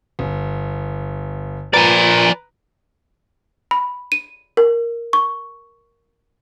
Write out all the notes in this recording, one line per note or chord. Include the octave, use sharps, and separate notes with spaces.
G1
F3 A#4 B4 D5 G#5 A#5
B5
D#7
A#4
C#6